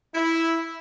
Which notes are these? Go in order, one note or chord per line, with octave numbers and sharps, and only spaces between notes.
E4